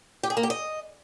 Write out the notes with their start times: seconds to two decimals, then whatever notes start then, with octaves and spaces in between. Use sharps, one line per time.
0.23 G4
0.30 G#4
0.37 A#3
0.43 G4
0.50 D#5